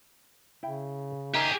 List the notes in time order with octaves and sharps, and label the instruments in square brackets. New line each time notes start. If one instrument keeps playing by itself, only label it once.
[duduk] C#3 [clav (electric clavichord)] E4 G5
[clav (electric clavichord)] D#4 A#4 E5 [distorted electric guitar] G4 G#4